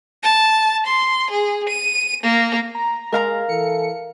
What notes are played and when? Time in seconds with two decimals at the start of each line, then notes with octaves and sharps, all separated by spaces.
0.23 A5
0.86 C6
1.31 G#4
1.69 D#7
2.23 A#3
2.75 A#5
3.12 G#3 A#4 F5 A#5
3.49 E3 A4 C#7